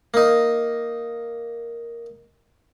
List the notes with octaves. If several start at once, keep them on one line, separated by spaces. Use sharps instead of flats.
A#3 D#4